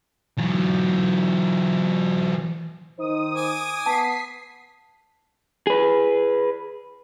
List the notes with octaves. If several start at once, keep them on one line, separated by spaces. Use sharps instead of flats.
E3 F#3
D#3 D#4 C5 D#6
G#5 D6
B3 A5 B6 C7
G#4 B4